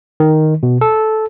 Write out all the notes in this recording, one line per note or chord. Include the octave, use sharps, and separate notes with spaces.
D#3
B2
A4